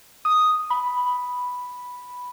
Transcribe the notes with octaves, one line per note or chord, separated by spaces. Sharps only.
D#6
B5